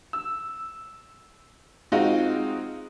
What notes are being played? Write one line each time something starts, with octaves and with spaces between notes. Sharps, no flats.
E6
G#3 C4 D#4 F4 F#4 D#5